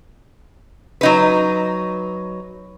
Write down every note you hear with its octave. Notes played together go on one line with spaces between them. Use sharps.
F#3 D#4 B4